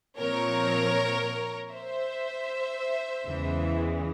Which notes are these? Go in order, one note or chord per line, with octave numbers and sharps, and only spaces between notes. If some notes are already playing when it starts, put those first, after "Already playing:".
A#2 F3 C4 A#4 C#5
C5 E5
E2 C#3 E3 G#3